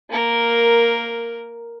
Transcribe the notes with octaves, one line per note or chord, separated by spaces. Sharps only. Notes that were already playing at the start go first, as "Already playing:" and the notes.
A#3 A#4